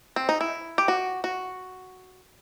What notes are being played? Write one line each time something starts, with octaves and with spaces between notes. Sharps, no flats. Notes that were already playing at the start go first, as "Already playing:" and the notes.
C4
D#4
E4
G4
F#4
F#4